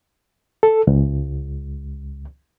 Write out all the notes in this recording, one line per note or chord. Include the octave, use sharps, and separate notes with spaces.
A4
C#2